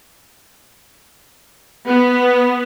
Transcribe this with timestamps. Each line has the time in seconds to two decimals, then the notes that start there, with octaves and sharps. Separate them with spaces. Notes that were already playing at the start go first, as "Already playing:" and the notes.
1.87 B3